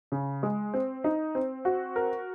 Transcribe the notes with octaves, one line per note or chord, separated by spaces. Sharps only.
C#3
G#3
C4
D#4
C4
F#4
A#4